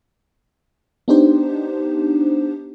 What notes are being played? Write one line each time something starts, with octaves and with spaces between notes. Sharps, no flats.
B3 D4 D#4 G4 C5